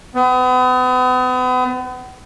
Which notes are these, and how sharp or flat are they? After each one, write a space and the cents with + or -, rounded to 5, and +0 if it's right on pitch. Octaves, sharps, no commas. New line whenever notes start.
B3 +40